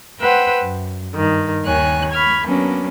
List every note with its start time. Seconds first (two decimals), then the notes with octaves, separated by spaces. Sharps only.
0.20 B4 C5 F#5 G5 E6
0.62 F#2
1.15 G2 D#3
1.65 D#2 D#3 C#5 G#5 F#6
2.12 B5 C#6 F6 G#6
2.44 F#3 A#3 B3 C#4 D4